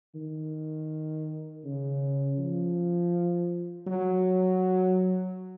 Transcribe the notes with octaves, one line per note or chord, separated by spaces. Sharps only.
D#3
C#3
F3
F#3